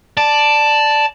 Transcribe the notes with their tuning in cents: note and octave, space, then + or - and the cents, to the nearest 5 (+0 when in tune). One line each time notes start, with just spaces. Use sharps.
D5 +0 A5 +0